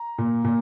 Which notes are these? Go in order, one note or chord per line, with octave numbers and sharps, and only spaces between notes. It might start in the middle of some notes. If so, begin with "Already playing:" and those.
Already playing: A#5
A#2
A#2